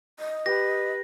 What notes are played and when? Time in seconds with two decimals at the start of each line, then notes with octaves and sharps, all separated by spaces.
0.19 D#5
0.46 G4 B4 A#6